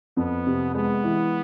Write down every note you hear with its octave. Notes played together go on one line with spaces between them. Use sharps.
F2 B3
C3
G#3 B3
E3